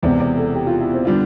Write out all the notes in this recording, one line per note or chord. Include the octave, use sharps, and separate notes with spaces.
E1 E2 C3 E3 D5
D5
A4
G4
F4
E4
C4
D3 G3 B3 D4 F4